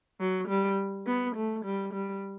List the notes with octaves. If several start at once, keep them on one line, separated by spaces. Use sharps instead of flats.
F#3
G3
B3
A3
G3
G3